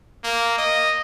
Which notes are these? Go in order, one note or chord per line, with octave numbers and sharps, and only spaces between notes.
A#3
D#5